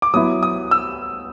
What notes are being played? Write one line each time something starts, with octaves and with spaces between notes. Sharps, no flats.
D6
F#3 B3 E4 D#6
D#6
E6